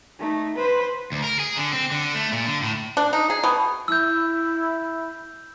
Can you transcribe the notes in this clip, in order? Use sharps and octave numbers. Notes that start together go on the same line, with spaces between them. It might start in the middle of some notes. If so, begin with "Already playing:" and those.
A3 D#4
B4 C5
D2
A#4
G#4
D3
C4
D3
A3
A#2
D3
A2
D4
D#4
G#4
B2
E4 E6 G6